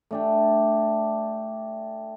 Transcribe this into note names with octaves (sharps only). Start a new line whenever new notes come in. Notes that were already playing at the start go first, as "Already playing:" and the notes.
A3 D4 G4